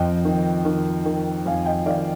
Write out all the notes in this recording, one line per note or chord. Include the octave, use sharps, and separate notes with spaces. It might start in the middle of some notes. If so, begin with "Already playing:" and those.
Already playing: F2 D#5 G5
D#3
D#3
D#3
F2 F5 G#5
D#5 G5
D#3 D5 F5